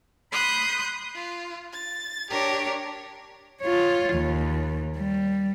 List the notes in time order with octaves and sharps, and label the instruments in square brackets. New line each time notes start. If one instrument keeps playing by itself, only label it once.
[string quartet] B5 C6 D#6 F#6 G6
F4
A6
D4 G4 A#4 C#5
[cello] F4 C#5
D#2
G3